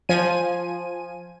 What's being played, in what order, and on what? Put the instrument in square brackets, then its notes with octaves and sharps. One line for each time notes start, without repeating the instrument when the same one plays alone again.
[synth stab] F3 G#5 D#7